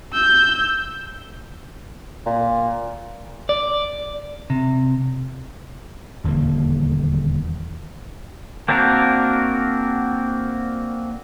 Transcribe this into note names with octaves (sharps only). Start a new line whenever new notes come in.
E6 G6
A#2
D5
C3
D#1 E2 D3 A#3
A#3 C4 D4 F#4 A#4